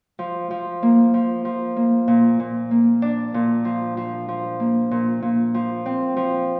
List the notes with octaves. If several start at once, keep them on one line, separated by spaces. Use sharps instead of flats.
F3
F3
A#3
F3
F3
A#3
A#2
A#2
A#3
D4
A#2
F3
F3
F3
A#3
A#2
A#2
F3
C4
F3